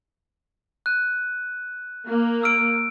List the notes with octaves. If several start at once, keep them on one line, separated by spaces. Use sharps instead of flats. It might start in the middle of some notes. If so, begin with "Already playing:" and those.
F#6 D#7
A#3
E6 F6 D7